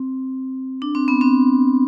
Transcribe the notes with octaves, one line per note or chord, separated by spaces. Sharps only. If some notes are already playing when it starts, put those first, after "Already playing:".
Already playing: C4
D4
C4
B3
C4